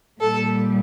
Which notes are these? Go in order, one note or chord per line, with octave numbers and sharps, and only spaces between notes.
A#2 G3 A4